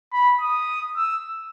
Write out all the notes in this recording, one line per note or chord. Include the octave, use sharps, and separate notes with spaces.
B5
D#6
E6